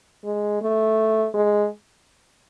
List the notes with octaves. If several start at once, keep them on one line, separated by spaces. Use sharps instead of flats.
G#3
A3
G#3